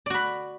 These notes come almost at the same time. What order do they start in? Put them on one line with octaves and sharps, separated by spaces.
D5 F#4 B5